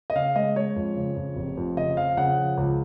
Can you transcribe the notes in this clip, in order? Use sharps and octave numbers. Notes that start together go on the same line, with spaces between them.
D#5
C#3 F5
G#3 D#5
G#3 C#5
F2
C#3
F2
F1
F2
C#3 D#5
F3 F5
C#3 F#5
F3
C#2